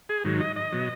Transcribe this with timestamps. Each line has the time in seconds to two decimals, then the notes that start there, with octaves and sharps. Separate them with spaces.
0.09 G#4
0.25 G#2 D#3 F#3
0.41 D#5
0.56 D#5
0.72 B2 F#3